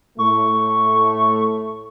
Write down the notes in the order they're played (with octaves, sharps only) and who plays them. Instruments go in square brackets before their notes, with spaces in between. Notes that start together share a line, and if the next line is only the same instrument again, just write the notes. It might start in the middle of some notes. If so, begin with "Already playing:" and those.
[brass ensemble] A2 A3 [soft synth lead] C#6